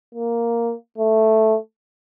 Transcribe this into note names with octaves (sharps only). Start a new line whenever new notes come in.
A#3
A3